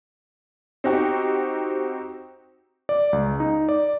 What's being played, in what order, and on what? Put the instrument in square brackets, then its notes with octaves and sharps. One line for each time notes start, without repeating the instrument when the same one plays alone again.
[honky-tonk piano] C4 D#4 F#4 G4
[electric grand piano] D5
C#2
D#4
D5